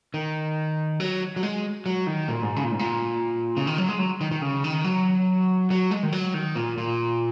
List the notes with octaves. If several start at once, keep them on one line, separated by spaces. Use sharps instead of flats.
D#3
F#3
F#3
G#3
F#3
D#3
A#2
G#2
C#3
A#2
G#2
A#2
C#3
D#3
F#3
G#3
F#3
D#3
D#3
C#3
D#3
F#3
F#3
G#3
D#3
F#3
D#3
A#2
A#2